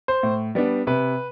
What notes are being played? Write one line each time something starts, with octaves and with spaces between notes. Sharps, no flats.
C5
A2
G3 B3 D4
C3 B4